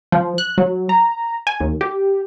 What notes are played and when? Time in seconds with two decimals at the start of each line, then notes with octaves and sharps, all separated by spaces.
0.12 F3
0.38 F#6
0.58 F#3
0.89 A#5
1.47 G#5
1.60 D#2
1.81 G4